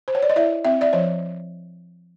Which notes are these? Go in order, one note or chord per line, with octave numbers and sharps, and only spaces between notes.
C5
C#5
D5
D#5
E4 D5 E5
C4 E5
D5 E5
F3 C#5 D#5